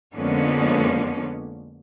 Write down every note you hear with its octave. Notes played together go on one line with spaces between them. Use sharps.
F2 D3 G#3 A#3 B3 C#4